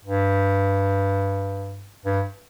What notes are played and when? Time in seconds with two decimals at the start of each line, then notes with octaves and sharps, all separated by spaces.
0.05 G2
2.05 G2